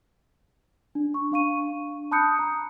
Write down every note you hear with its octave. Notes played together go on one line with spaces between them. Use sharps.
D4
C#6
D4 F5 C#6 D#7
A5 B5 D#6 F#6 G6 C#7
A#5